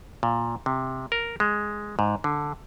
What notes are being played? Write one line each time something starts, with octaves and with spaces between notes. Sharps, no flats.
A#2
C3
A#4
G#3
G#2
D3